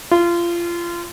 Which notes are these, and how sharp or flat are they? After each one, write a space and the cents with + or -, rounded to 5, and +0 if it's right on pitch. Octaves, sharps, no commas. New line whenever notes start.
F4 -25